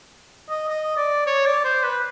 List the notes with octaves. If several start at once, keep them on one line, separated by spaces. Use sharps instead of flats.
D#5
D#5
D5
C#5
D5
C5
B4